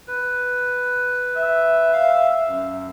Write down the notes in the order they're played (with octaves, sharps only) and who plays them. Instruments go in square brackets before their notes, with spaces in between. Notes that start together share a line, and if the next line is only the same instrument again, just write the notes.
[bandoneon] B4
[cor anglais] E5
[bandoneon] F5
F#2